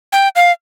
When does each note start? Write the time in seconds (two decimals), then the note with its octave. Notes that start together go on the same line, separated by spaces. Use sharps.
0.12 G5
0.36 F5